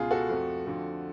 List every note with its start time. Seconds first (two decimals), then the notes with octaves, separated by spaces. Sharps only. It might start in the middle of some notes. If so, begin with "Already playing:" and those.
Already playing: C#2 B2 G#3 F4 G#4
0.11 F#4 A4
0.30 F2 F3 A3
0.67 F2 D3 F3 A3